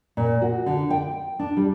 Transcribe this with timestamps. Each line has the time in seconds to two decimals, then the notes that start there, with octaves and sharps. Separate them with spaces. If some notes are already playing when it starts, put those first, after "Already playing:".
0.17 A#2
0.42 F#4
0.66 D3
0.90 G5
1.39 D4
1.57 G3